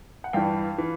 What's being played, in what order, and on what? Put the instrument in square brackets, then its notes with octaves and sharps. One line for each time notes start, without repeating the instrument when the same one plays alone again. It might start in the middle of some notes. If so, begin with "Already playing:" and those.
[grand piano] F#5
G2 E3 F5 G5
E3